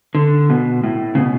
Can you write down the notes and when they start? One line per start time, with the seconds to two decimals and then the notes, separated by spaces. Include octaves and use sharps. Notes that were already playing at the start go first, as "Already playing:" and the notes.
0.15 D3
0.50 B2
0.84 A2
1.15 C#3
1.18 B2